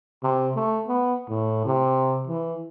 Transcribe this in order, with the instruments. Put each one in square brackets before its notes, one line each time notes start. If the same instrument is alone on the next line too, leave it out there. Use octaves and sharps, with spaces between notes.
[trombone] C3
A3
B3
A2
C3
E3